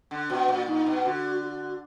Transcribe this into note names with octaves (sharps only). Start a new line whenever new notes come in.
D3
B2 F#4
A#2
A#2 D#4
B2
D3 F#4
F#4